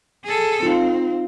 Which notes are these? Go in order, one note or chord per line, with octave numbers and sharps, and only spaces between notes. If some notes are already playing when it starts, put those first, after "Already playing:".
G#4 A4
C4 D#4 F4